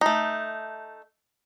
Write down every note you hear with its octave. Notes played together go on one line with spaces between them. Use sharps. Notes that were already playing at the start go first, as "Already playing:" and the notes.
A3 D#4